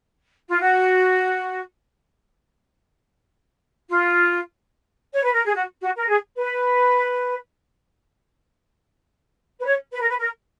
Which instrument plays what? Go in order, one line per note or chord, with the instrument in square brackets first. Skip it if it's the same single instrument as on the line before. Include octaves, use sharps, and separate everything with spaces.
[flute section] F4
F#4
F4
C#5
B4
A#4
G#4
F#4
F#4
A#4
G#4
B4
B4
C#5
B4
A#4
B4
A#4